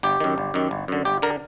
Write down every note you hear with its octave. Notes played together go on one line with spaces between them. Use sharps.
G1 G4
F#2 D#3
G1
F#2 D#3
G1
F#2 D3
G1 G4
D3 A#4